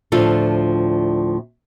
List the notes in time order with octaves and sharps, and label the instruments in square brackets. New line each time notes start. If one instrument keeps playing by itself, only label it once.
[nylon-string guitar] D2 A2 F3 D4 F4 A4